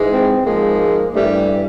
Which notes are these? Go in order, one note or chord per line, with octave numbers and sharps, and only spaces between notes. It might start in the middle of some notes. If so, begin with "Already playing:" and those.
Already playing: G#2 E3 G#3
C4
G#2 F3 G#3 A#3
G2 E3 G3 A3